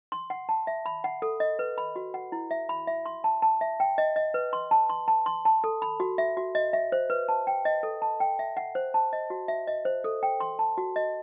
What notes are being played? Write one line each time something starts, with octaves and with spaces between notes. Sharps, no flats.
C6
F#5
A5
E5
B5
F#5
A4
D#5
B4
B5
F#4
F#5
E4
E5
B5
E5
C6
A5
A5
E5
G5
D#5
D#5
B4
C6
A5
C6
A5
C6
A5
A4
B5
F#4
E5
F#4
D#5
E5
C5
B4
A5
G5
D#5
A4
A5
G5
E5
F#5
C5
A5
D#5
F#4
E5
D#5
C5
A4
G5
C6
A5
F#4
D#5